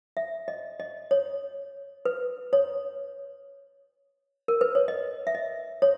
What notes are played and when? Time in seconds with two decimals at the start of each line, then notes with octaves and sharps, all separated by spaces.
0.17 E5
0.48 D#5
0.80 D#5
1.11 C#5
2.05 B4
2.53 C#5
4.48 A#4
4.61 B4
4.75 C#5
4.88 D#5
5.27 E5
5.35 D#5
5.82 C#5